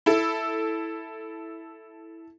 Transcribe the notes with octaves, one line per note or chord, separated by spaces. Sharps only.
E4 A4